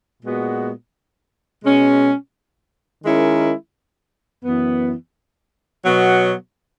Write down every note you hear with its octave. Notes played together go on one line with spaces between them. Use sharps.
A#2 G#3 B3 F#4
B2 G#3 C#4
D#3 G#3 C#4 E4 A#4
F#2 E3 B3
B2 F#3 B3 F#4 C#5